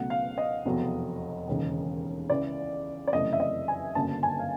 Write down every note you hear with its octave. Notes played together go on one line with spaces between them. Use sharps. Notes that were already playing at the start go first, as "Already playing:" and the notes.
Already playing: C#2 B2 F#3 A3 F#5
F5
D#5
F1 E2 B2 F#3
E1 D#2 C#3
C#2 C#3 E3 D5
D5
F#1 F2 C3 E3 A3 D#5
E5
D#5
G#5
G1 F#2 C#3 F#3 A#3 A5
G#5
F5